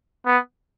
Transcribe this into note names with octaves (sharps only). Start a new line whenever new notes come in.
B3